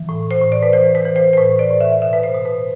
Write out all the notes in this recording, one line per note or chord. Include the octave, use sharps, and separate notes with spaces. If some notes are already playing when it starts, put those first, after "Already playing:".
Already playing: E3
A2
C5
A2
D5
B4
E3 C5
B4
E3
C5
C5
A2 B4
D5
A2
E5
B2 E5
B4
C5
B2
B4